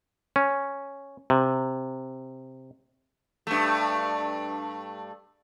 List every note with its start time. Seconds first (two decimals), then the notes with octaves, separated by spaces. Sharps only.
0.36 C#4
1.30 C3
3.47 G2 A3